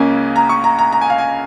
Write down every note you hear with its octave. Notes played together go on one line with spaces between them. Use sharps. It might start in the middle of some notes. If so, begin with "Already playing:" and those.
Already playing: C#2 C#3 A#3 C#4 G#5
A#5
C#6
A#5
A#5
A#5
G#5
F5
G#5